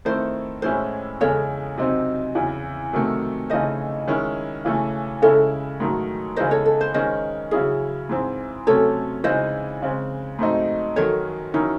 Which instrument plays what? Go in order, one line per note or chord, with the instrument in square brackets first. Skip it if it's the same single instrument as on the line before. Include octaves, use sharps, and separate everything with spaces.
[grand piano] D#3 A3 C4 E4 [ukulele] C5
[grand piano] A2 E3 G#3 C#4 E4 [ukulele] C5
[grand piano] E2 C#3 G#3 C#4 [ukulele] A4 C#5
[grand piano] C3 F#3 C4 D#4
E2 C#3 E3
C3 D#3 F#3 A3
[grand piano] C#3 E3 A3 D#4 [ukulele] C5 D#5
[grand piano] D#3 G#3 C#4 E4
C#3 E3 A3 C#4
[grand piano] C#3 G#3 C#4 E4 [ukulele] A4 C#5
[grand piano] G#2 D#3 F#3 A3
[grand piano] C#3 E3 G#3 D#4 [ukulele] C5 D#5
[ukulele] A4 C#5
A4
C5
[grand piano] D#3 G#3 C#4 [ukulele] C5 D#5
[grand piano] C#3 F#3 C#4 E4 [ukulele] G#4
[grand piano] G#2 E3 C4
[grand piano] C3 F#3 A3 C#4 [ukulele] A4 C#5
[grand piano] C#3 E3 G#3 D#4 [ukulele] C5 D#5
[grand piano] C#3 G#3 C4
G#2 F#3 A3 C4 D#4
[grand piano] F#2 D#3 F#3 [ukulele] A4 C#5
[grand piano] D#3 F#3 C#4 E4 [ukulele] D#4